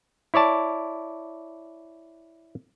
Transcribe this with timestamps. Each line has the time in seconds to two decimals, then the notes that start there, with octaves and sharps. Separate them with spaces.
0.34 E4 C#5 D5 A5